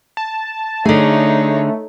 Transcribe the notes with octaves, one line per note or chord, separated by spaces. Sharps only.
A5
D3 A3 D#4 G#4 C#5